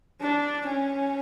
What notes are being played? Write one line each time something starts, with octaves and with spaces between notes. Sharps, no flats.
D4
C#4